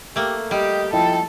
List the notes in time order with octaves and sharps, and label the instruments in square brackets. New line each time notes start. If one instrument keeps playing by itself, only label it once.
[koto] A3 A#3 [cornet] G4
[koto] G3 [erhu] G4 [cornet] D#5
[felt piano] F3 E4 D#5 [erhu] A4 [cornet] G5